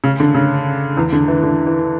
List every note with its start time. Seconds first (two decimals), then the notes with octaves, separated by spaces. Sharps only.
0.04 C#3
0.20 D3
0.35 C#3
0.97 E2
1.12 D3
1.28 E3
1.43 D3
1.67 E3